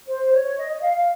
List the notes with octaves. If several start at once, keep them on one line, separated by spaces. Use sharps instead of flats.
C5
C#5
D#5
D#5
F5
F5